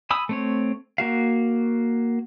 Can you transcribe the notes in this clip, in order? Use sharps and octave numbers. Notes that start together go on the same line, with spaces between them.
G#5 B5 D#6 E6
A3 C4 C#5
A#3 F#4 F5